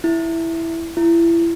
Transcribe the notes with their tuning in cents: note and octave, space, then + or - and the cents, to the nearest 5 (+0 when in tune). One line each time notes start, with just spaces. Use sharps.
E4 +0
E4 +30